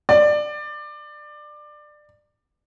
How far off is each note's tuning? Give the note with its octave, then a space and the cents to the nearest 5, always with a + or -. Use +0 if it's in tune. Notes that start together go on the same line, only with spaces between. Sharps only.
D5 +20